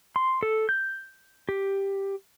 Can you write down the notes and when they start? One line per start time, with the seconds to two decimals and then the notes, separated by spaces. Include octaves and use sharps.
0.16 C6
0.43 A4
0.69 G6
1.49 G4